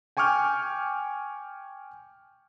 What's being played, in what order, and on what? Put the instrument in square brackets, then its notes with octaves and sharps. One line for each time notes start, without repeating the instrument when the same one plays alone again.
[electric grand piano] G5 G#5 C#6 D6 F6 G6